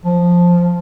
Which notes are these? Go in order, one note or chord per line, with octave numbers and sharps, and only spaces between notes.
F3